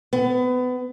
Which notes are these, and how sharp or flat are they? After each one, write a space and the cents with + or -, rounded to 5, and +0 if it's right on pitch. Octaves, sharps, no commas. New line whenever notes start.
B3 +25